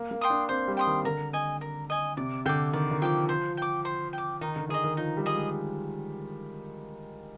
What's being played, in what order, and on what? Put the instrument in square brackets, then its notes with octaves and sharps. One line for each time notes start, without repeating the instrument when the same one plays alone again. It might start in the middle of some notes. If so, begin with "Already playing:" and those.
Already playing: [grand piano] A#3
A#3
[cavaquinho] G5 C6 D#6
[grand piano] D4
[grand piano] C4 [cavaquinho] C5
[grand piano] G3
[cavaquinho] G5 C6 D#6
[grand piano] D#3
[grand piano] D3 [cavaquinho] A#4
[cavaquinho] D#5 G#5
A#4
D#5 G#5
[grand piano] C3 [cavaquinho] D5
[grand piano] D3 [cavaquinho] G5 D6
[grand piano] D#3 [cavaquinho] D5
[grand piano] D#3
[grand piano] F3 [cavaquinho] G5 D6
[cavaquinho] C5
G5 D6
C5
G5 D6
[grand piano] D#3 [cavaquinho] D#4
[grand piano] D3
[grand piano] D#3 [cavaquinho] G#4 D#5
[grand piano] D#3
[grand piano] F3 [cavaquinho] D#4
[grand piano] G3
[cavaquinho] G#4 D#5
[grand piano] G#3